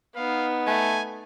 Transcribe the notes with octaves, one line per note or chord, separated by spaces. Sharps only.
B3 D#4 F5
A3 G#5